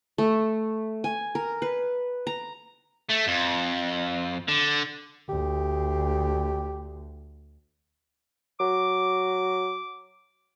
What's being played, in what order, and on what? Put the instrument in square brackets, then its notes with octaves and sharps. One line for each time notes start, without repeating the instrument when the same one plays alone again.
[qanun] A3
G#5
A#4
B4
A#5
[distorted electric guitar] A3
F2
D3
[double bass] D2 [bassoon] G4
[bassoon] F#3 [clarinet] D6